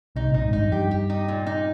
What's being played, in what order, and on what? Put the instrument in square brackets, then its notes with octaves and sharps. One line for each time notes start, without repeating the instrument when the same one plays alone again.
[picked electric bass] C2 C3 [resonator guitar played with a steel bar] D#4
[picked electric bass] A#1 A#2 [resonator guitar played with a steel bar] D#4
[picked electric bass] G#1 G#2
[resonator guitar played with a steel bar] D#4
[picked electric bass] G2
F2
[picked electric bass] G2 [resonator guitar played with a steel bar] G4
[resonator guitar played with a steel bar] G4
D#4
A#2
D#4